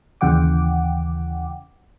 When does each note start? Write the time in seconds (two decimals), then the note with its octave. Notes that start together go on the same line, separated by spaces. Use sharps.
0.21 D#2 C#3 E3 F#5 G5 D6